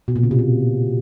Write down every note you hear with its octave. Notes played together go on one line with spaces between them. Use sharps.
B2
A#2
C#3
C3
B2